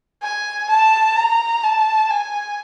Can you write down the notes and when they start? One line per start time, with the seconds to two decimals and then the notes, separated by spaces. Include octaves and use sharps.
0.23 G#5
0.69 A5
1.16 A#5
1.63 A5
2.10 G#5